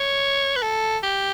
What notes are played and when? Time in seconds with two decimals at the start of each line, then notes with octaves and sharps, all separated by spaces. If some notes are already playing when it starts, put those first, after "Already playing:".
Already playing: C#5
0.56 B4
0.62 A4
1.03 G4